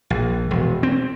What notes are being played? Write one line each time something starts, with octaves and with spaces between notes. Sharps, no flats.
A#1
E1
C4